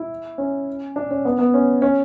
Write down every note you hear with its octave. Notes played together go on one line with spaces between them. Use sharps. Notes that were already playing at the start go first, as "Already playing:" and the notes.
Already playing: E4
C#4
D4
C#4
B3
B3
C#4
C#4